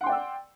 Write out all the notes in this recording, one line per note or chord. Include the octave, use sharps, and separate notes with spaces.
D5 F#5 G5 C6 E6